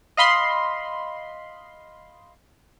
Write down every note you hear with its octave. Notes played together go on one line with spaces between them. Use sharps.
D#5 F5 B5 C6